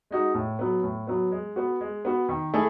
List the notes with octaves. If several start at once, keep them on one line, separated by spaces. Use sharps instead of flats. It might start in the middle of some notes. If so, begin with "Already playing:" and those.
G#3 D#4 F#4
A2
F#3 B3
A2
F#3 B3
G#3
B3 F#4
G#3
B3 F#4
D#3
A3 E4 G#4